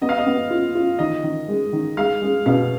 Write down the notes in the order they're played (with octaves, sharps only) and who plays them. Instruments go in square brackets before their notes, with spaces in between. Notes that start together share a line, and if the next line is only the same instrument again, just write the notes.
[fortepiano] B3 [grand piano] D#5
[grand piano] F5
D#5
[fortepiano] B3
F4
F4
[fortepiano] D#3 [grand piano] D#5
[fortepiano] D#3
G#3
D#3
[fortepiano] G#3 [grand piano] F5
[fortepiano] G#3
[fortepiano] B2 [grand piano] F5